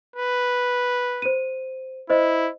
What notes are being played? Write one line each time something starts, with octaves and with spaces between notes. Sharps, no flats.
B4
C5 D#7
E4 C5 D#5